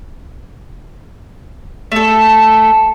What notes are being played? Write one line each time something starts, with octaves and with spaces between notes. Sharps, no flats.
A3 A4